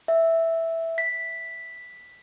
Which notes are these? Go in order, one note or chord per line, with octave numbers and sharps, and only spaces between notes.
E5
B6